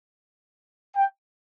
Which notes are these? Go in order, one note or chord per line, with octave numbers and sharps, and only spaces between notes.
G5